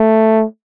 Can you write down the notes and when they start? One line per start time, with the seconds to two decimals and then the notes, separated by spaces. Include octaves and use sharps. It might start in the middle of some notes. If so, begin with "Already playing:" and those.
Already playing: A3